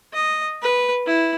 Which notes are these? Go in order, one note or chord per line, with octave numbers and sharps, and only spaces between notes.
D#5
B4
E4